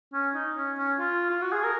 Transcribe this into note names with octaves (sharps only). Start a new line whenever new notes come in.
C#4
D#4
C#4
C#4
F4
F4
F#4
G#4
A#4